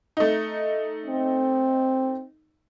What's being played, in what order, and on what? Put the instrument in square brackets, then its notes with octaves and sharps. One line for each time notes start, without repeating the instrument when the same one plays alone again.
[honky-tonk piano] A3 D#4
[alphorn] C4